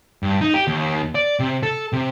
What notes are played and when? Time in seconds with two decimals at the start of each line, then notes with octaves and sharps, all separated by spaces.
0.23 G2
0.41 D#4
0.54 G4
0.68 D#2
1.15 D5
1.39 C3
1.63 A4
1.93 C3